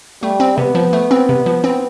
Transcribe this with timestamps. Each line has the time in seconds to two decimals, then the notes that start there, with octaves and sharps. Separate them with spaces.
0.22 G3 A3
0.40 C4
0.58 C3 B3
0.75 F3
0.93 A3
1.11 C4
1.29 C3
1.46 F3
1.64 C4